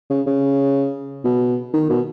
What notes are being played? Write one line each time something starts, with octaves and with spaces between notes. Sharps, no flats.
C#3
C#3
B2
D#3
B2